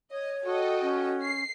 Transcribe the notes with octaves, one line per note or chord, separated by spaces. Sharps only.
C#5 D#5
F#4 A4 D#5 G5
C#4
C7